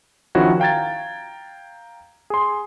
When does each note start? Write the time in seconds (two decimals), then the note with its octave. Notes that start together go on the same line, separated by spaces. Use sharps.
0.35 D#3 F3 C#4 E4 F#4 C#5
0.60 F5 G5 A#5 G#6 A6
2.30 G#4 C6